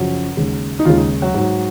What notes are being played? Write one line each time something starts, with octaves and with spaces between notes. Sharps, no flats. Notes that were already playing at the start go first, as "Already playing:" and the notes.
Already playing: F#2 C#3 F3 F#3 F#4
D#2 C#3 G#3
D#4
D#2 C#3 G#3 F4
D#4
F#3 F#4
G#2 F#3